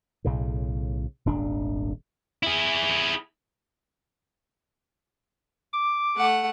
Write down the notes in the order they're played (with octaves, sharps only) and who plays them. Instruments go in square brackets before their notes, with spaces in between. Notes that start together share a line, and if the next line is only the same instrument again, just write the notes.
[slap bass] B1 A2 C#3
D#1 G#1 D4
[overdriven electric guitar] E4 G#4
[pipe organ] D6
[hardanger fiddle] A3 F#5